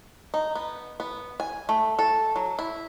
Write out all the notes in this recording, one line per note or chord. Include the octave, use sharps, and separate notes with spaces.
D#4
B3
B3
G#5
A3
A4
F#3
E4